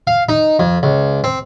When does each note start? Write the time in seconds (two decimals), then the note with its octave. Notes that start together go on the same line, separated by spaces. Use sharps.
0.07 F5
0.29 D#4
0.59 F2
0.83 C#2
1.24 C4